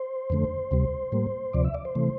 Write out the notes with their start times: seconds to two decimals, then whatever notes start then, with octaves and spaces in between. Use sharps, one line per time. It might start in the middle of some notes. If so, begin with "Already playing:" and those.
Already playing: C5
0.30 F2 D3 A3
0.71 D2 C3 G3
1.12 A2 G3 A#3
1.53 D2 C3 F3 D5
1.64 E5
1.74 D5
1.85 C5
1.95 C3 E3 A3